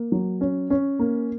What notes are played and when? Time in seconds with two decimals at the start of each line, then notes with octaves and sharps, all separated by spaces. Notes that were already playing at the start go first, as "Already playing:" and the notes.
Already playing: A#3
0.12 F#3
0.41 C#4
0.70 C#4
0.99 A#3